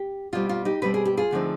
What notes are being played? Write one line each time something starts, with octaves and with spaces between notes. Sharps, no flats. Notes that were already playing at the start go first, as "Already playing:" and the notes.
Already playing: G4
B2 G3 C4 F4
F4
D#4 G4
B2 G3 C4 B4
G#4
G4
F4 G#4
D2 D3 F3 C4 D#4